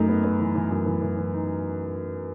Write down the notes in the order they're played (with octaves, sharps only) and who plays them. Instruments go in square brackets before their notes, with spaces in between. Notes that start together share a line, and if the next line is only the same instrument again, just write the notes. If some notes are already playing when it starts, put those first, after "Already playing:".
Already playing: [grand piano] F#2 D#4 [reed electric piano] A3
[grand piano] B3
B3
E3
E3
F#2
E3
E3
E3
D#4